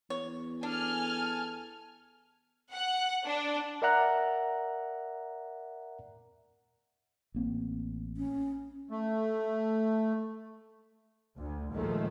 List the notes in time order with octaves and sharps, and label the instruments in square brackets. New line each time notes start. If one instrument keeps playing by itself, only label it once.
[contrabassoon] E2 [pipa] C#5
[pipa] D4 [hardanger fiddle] A4 [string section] G#5 F6
[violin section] F#5
D4
[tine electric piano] A#4 D5 E5 F#5 A#5 F#6
[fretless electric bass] A1 A#3 C4
[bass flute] C#4
[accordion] A3
[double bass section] D2
A#1 D#2 D#3 F3 G#3 A3